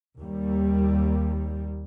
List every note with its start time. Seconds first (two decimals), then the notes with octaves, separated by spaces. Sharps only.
0.17 D#2 G3